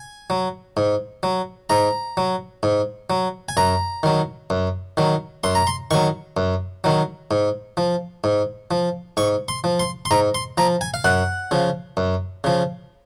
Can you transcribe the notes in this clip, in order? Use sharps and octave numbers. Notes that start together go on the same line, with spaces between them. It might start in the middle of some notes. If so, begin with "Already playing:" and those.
Already playing: G#5
F#3
G#2
F#3
G#2 A#5
F#3
G#2
F#3
G#5
F#2 A#5
D#3 F#3
F#2
D#3 F#3
F#2 C6
A#5
C6
D#3 F#3 C#6
F#2
D#3 F#3
G#2
F3
G#2
F3
G#2 C#6
C6
F3
C6
C6
G#2 A#5
C6
F3 A#5
G#5
F5
F#2 F#5
C#3 F3
F#2
C#3 F3